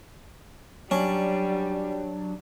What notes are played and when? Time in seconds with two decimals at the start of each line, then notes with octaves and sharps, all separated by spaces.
0.91 F#3 G3 C#4 D4